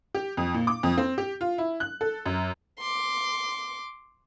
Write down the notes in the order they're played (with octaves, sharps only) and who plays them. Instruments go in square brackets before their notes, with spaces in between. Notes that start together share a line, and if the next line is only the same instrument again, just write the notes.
[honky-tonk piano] G4
F2
A#2
D6
F2
C4
G4
F4
E4
F#6
A4
F#2
[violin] C6 D6